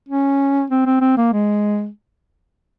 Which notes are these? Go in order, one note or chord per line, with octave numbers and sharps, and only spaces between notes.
C#4
C4
C4
C4
A#3
G#3